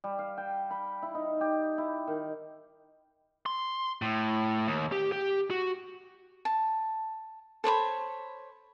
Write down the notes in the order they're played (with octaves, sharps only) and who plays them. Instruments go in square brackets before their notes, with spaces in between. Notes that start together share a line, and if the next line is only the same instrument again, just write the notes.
[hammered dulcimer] G3
F5
G5
B5
E4
D#4
G4
E4
D#3
[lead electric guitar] C6
A2
D#2
G4
G4
F#4
[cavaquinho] A5
A4 C5 C#5 B5